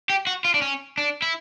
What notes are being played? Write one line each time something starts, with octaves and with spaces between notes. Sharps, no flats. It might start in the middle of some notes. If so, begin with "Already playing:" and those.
G4
F#4
F4
D4
C#4
D4
E4